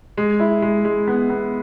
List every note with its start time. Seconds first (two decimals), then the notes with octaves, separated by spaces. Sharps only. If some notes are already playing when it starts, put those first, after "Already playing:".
0.17 G#3
0.40 E4
0.62 G#3
0.85 G#3
1.07 B3
1.30 B3